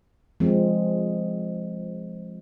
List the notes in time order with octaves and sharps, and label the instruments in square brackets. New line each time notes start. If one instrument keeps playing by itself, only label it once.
[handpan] F3 G#3 C4